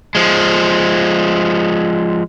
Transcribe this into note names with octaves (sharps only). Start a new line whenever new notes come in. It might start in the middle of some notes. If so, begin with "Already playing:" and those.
F3 G#3